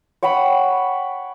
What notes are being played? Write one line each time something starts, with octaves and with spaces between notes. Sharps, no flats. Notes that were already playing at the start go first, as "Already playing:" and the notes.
C#5 F#5 G5 B5